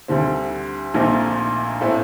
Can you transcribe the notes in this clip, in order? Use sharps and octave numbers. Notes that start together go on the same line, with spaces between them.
D2 D3 G3 C4
A#1 A#2 A3 C4 D#4
A2 A3 C4